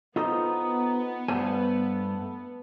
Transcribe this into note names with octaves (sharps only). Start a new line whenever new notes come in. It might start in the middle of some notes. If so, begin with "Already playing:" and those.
B3 D#4 F4 A4 C5
G2 A3 C5 G#5